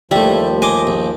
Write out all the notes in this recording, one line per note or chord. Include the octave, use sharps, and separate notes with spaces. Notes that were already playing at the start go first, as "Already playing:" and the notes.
D#2 F3 G3 A3 E4
D#5 G#5 C6 D6
A#1